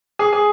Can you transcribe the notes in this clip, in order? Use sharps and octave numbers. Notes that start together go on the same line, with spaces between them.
G#4
G#4